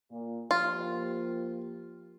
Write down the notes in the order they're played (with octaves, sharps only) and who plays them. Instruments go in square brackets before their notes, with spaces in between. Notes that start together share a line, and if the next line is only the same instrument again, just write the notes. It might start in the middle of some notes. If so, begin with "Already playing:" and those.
[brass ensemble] A#2
[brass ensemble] F3 A#3 G4 [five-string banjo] F4